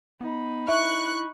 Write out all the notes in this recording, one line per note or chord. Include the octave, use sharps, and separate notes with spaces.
B3 D#4 B5
E4 E5 C#6 F#6